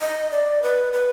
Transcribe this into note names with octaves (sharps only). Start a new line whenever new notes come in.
D#5
D5
B4
B4